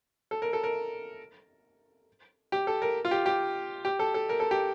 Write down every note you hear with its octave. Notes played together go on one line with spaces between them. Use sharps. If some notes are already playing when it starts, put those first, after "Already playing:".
A4
A#4
A4
A#4
G4
A4
A#4
F4
G4
G4
G4
A4
A4
A#4
A4
G4